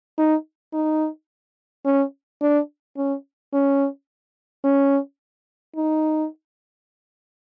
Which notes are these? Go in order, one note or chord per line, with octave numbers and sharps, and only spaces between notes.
D#4
D#4
C#4
D4
C#4
C#4
C#4
D#4